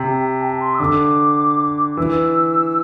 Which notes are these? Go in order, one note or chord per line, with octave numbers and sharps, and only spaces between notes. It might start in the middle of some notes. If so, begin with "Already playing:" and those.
Already playing: C3
G5
A5
C6
E6
D3 D6
E3 E6